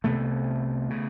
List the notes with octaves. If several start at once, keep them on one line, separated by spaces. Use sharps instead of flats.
C2 C3 A3 B3
C#3